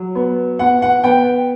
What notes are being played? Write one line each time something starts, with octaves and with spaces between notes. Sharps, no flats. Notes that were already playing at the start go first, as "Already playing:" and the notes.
Already playing: F#3
B3
B3 F#5
F#5
B3 G5